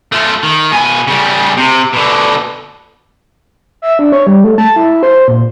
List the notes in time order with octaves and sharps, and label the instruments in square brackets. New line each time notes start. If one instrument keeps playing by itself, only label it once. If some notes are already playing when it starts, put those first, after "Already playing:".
[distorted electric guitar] A3 F4
D#3
B2 G#5
C#3 G3
C3
B2 D3
[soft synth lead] E5
D4
C#5
G3
A3
A5
E4
C5
A#2